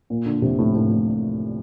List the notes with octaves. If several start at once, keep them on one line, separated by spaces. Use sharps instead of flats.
A#2
D3
C3
A2
A2
A2